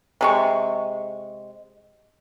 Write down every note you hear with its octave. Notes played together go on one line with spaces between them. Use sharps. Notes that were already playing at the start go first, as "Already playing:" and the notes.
C3 G#3 C#6